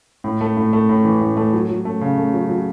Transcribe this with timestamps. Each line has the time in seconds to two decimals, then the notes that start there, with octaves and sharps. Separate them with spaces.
0.24 A2
0.41 A3
0.57 A2
0.73 A3
0.89 A2
1.05 E3
1.21 A2
1.37 A3
1.53 F#3
1.69 F#3
1.85 A3
2.01 C#3
2.18 A3
2.34 F#3
2.49 F#3